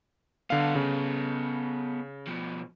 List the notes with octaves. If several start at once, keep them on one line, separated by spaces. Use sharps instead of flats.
D3 B3 A4 F5
C#3
B2 F3